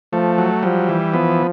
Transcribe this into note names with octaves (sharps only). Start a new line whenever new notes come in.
F3 A3
F#3
F3 G3
E3
F3 B3